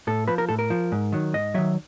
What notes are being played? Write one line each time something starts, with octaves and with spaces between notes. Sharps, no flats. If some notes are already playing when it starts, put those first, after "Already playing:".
A2 A4
F3 B4
A#4
A2 A4
A#4
F3
G#2
D#3 F#3
G#2 D#5
D#3 F#3 E5